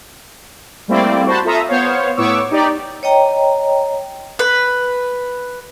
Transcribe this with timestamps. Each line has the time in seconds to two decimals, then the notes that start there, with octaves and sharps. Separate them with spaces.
0.88 G3 A3 A#3 C4 E4 D5
1.26 F#4 C5 A5 B5
1.45 F4 A4 E5 A#5 D#6
1.68 B3 C5 C#5 F5
2.17 A2 B3 C#5 C#6 D6 E6
2.51 D#4 G4 D5
3.03 C#5 D#5 G5 A#5
4.39 B4